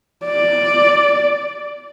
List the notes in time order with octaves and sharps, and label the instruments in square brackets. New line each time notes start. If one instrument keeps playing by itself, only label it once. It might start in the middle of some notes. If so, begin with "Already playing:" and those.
[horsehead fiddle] D5